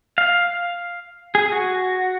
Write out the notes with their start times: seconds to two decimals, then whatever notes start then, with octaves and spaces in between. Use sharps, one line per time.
0.18 F5
1.35 G#4
1.52 F#4